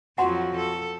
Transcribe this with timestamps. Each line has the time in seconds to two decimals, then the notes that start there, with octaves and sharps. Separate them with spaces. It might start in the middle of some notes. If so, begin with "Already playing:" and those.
0.18 F2 F3 F#3 F#4 F#5 C6
0.57 A4